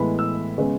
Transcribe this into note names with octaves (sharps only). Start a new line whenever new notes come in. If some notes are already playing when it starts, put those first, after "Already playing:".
Already playing: A2 E3 G#3 B3 B5
E6
C#3 G#3 B3